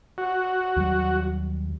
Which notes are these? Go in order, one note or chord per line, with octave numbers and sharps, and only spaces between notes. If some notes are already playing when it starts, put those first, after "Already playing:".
F#4
D#2 F#3 G3